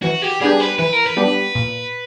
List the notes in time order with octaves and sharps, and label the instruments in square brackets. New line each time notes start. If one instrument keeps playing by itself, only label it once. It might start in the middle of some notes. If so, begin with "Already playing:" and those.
[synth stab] E3 [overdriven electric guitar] F#4
[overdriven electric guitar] G4
[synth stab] G3 B3 D4 G4 [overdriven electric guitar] G#4
[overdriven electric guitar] B4
[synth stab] E3 [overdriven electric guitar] B4
[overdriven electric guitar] A#4
B4
[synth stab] G3 B3 D4 G4
A#2